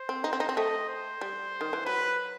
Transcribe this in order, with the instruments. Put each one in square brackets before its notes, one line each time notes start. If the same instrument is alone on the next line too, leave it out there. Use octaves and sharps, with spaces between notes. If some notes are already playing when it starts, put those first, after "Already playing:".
Already playing: [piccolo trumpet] C5
[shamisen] C4
D#4
C4
D#4
C4
[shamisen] A3 [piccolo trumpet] D#5
[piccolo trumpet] C5
[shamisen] G3
D#3
E3
[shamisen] F#3 [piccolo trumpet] B4